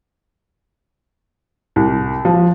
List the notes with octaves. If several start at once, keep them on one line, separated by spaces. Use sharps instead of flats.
C2
F3